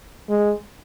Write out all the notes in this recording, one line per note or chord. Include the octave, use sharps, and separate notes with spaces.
G#3